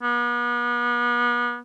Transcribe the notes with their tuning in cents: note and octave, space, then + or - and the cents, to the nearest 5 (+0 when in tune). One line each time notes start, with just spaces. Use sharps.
B3 -40